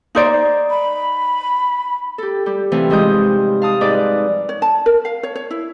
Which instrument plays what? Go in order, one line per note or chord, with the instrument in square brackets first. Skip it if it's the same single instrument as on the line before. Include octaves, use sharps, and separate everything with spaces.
[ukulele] D#4 C5 D5
[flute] B5
[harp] G4 A4
G3 G4
C3 E3 F3 A3 C4
G#2 F3 G3 G#3 D#6 G6
F5 A5 D#6
G#2 B4 D5 D6
[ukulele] C#5
A5
A#4
F5
C#5
C#5
E4